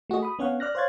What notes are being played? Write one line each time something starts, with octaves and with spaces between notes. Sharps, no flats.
A3 F#4 G#4 D#5
B5 D#6
B3 C#4 C#5 F5 F#5
D5 F6 F#6 A#6
C5 C#5 F5 F#6 G#6 A6